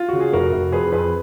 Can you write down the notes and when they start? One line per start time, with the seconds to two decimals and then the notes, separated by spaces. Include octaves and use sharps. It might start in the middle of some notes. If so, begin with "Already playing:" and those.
Already playing: F4
0.09 C#3 F#4
0.21 G#4
0.33 F1 F#4 A#4
0.52 F1
0.72 F2 G#4 B4
0.92 F2 G#4 B4